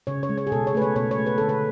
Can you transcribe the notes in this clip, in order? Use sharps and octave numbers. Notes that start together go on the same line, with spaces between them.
C#3 C#5
C#5
G#3
C#5
G#4
B2 A4
C#5
A3 B4
C#5
B2 C#5
C#5
A3
B4
D3 A4
B4